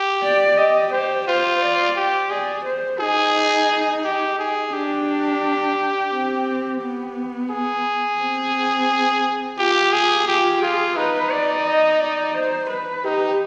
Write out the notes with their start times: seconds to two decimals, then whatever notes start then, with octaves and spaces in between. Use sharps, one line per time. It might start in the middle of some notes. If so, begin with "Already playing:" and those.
Already playing: G4
0.23 D5
0.57 G4 D#5
0.92 G4 C5
1.27 F4 C5
1.61 D5
1.96 G4
2.31 G#4 D5
2.66 C5
3.00 D#4 G#4
4.04 G4
4.39 G#4
4.73 D4 G4
6.12 C4
6.81 B3
7.50 G#4
8.20 C4
9.58 F4 G4
9.93 G#4
10.27 F4 G4
10.62 F4 G#4
10.97 D#4 B4
11.31 D5
11.66 D#5
12.00 D5
12.35 C5
12.70 B4
13.05 D#4 G4